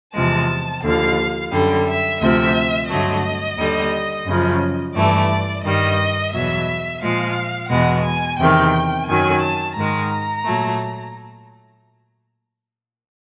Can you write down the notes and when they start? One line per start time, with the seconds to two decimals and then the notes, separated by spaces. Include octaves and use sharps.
0.15 E2 C3 F3 G#3 A5
0.84 D#2 D3 F3 F5
1.52 F#2 D3 G3
1.87 E5
2.21 D2 C3 F3 E5
2.89 G2 D3 F#3 A3 D#5
3.58 D#2 D3 G3
4.27 F#2 C#3 F3
4.95 G2 E3 A3 D5
5.64 G2 D#3 G3 D#5
6.33 E2 B2 F#3 E5
7.01 A#2 F3 G#3 F5
7.70 E2 B2 G#3 F#5
8.04 G#5
8.39 E2 C3 D#3 G5
9.07 F#2 D#3 F#3 G#5
9.42 A5
9.76 G#2 D#3 G#3 A#5
10.45 A#2 F#3 A3